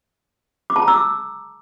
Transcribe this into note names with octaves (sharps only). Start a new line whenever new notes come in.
D6
A5
A#5
E6
D6